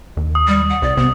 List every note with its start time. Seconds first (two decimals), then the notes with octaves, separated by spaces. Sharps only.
0.17 D#2
0.35 D#6
0.48 G3
0.70 F#5
0.82 C2 D5
0.97 C3 B3